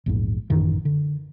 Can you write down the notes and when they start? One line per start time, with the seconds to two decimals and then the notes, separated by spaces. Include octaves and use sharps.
0.06 A#1 E2 G#2
0.50 A1 F#2 D#3 E3
0.85 D3